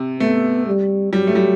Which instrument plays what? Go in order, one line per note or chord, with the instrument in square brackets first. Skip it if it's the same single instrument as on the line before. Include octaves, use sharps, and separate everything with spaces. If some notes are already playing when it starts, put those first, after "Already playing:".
Already playing: [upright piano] C3
[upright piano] A3 [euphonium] B3
[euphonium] G3
[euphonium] F#3 [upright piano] G3
[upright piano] A3
G3